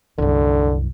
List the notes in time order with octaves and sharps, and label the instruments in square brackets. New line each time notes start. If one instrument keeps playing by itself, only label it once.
[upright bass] C2 F#2 [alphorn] D3